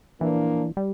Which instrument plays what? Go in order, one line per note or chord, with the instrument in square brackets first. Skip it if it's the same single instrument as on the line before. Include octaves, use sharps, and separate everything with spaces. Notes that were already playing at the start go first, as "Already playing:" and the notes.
[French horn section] A#2 F3 A#3 D4 [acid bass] E3
[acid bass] G3